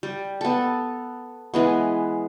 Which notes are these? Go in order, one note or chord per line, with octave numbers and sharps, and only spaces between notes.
G3
B3 A4
E3 G#3 B3